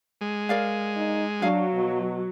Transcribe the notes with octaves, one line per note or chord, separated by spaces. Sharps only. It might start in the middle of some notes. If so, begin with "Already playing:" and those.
G#3
A#4 D5 F5
D#4
F#3 D4 F5
B2